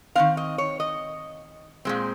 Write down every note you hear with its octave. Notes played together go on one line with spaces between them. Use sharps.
D#3 G#3 C4 F5
D#5
C#5
D#5
A#2 G#3 C4